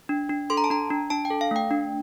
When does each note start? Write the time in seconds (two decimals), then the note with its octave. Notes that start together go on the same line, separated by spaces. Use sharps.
0.09 D4
0.29 D4
0.50 A4 C6
0.57 A#5
0.64 A5
0.70 D4 A#5
0.90 D4
1.10 D4 A5
1.25 G5
1.30 A4
1.41 F5
1.51 A3 G5
1.71 D4